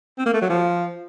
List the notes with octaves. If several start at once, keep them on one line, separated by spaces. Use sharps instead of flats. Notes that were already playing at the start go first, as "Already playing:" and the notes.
C4
A#3
A3
F#3
F3